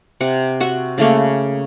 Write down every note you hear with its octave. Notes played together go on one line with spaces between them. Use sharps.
C3 F#5
F#4 E5 F#5
C#3 A3 A#3